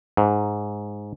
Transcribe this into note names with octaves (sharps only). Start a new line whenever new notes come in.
G#2